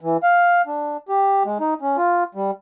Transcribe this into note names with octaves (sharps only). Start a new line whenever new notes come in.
E3
F5
D4
G4
G#3
D#4
C#4
F4
G3